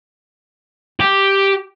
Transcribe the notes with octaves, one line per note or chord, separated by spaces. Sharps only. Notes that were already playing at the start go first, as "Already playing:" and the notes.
G4